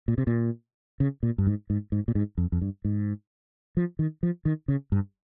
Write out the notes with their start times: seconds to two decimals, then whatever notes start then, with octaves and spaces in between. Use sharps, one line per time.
0.08 A#2
0.18 C3
0.27 A#2
1.00 C#3
1.23 A#2
1.38 G2
1.47 G#2
1.70 G#2
1.92 G#2
2.08 A#2
2.15 G#2
2.38 F2
2.52 F2
2.62 G2
2.85 G#2
3.77 F3
3.99 D#3
4.23 F3
4.45 D#3
4.68 C#3
4.92 G2